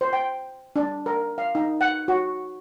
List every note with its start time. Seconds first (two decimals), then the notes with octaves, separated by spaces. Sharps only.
0.01 C5
0.13 G5
0.76 D4
1.06 A#4
1.38 F5
1.55 D#4
1.81 F#5
2.08 F#4